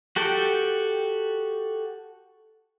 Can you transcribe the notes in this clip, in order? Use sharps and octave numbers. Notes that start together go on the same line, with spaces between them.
F#4 G4 A4 G5